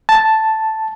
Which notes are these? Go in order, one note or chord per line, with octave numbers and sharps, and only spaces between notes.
A5